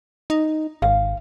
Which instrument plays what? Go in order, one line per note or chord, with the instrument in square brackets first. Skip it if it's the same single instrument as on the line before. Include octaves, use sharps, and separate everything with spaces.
[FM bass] D#4
[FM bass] G#1 [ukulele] F5